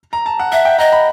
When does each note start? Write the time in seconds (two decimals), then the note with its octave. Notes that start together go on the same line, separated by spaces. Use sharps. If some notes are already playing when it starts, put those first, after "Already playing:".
0.13 A#5
0.26 A5
0.39 F#5
0.52 E5 F#5
0.65 G5
0.78 D#5 A#5
0.92 B5